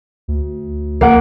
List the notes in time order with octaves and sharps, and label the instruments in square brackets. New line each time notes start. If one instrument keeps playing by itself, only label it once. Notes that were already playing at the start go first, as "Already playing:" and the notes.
[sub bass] D2
[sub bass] C#2 [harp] A#3 F#5 D7